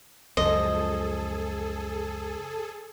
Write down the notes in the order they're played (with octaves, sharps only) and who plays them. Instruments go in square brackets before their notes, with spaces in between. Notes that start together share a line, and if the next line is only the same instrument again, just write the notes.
[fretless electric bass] C#2 F#2 F3 [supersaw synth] G#4 A4 [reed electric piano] C5 [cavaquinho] D#5